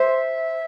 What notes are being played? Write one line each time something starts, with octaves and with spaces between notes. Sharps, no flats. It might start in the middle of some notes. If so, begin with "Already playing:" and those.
Already playing: C5 E5